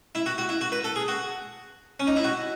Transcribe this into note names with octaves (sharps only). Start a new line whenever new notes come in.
E4
F#4
F#4
E4
F#4
B4
A4
G#4
F#4
C#4
D#4
E4
F#4